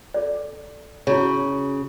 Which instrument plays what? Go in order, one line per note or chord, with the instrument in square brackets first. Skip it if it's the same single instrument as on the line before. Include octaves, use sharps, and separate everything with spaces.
[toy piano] A4 D5
[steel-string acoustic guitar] C#3 [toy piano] E4 F#4 C#5